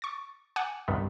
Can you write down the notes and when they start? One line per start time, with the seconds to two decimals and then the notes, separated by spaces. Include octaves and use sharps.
0.02 C#6 A6
0.56 F#5 G#5 D6
0.88 C2 G2 D#3 B3